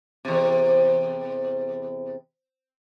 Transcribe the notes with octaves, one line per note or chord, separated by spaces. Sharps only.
E2 C3